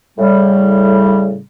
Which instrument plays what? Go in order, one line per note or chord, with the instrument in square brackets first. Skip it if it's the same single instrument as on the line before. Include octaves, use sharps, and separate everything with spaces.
[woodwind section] A2 C#3 G3